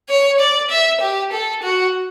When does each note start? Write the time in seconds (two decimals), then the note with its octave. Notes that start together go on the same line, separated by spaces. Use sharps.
0.09 C#5
0.40 D5
0.70 E5
1.01 G4
1.32 A4
1.63 F#4